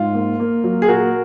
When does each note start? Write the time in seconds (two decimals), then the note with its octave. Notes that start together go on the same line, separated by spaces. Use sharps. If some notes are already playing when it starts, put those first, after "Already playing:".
Already playing: G#2 F4
0.14 A#3
0.40 A#3
0.64 F#3
0.82 G#4
0.88 A#2 F#4 A#4